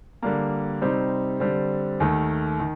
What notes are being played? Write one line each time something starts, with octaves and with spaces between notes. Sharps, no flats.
D3 G3 A#3
C3 G3 C4 D#4
D3 G3 C4
D#2 D#3 A3
D#3